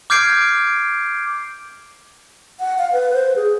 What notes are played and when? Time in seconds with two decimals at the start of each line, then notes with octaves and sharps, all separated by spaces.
0.10 D6 F6 G6 G#6 C7 D7
2.60 F#5
2.78 F5
2.93 B4
3.14 C5
3.36 G#4